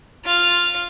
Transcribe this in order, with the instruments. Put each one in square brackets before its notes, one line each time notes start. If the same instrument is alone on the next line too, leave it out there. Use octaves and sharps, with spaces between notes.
[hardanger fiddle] F4 F5